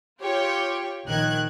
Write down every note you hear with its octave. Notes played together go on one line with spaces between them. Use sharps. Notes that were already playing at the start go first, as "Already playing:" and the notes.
F4 G4 C#5 G5
A#1 D#3 F#6 G#6